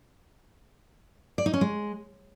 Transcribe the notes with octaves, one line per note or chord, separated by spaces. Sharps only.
D5
D#4
C#4
G#3